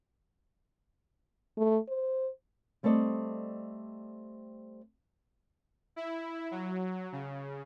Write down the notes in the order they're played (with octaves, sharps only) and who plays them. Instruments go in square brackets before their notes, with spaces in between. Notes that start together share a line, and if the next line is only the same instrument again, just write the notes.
[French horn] A3
C5
[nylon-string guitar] G3 A3 C4 A4 D5 D#5
[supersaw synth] E4
F#3
C#3